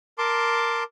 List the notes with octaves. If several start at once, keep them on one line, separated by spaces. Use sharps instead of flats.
A#4 A5 C6 D6